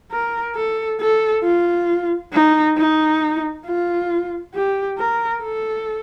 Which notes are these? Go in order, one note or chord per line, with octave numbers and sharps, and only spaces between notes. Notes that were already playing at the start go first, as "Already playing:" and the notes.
A#4
A4
A4
F4
D#4
D#4
F4
G4
A#4
A4